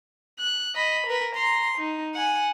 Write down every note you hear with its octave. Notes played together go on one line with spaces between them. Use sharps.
F#6
D#5 B5
A#4 B4
A#5 C6
D#4
F#5 G#5